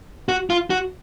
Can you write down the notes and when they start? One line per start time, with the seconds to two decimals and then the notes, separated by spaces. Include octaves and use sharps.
0.29 F#4
0.50 F4
0.70 F#4